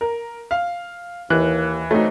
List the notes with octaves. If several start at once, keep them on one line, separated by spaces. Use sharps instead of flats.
A#4
F5
D#2 E3 F#6
F#3 A3 C4 D#4